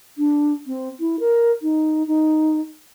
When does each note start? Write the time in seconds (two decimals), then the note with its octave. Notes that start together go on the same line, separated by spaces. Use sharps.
0.18 D4
0.67 C4
1.00 E4
1.20 A#4
1.62 D#4
2.07 D#4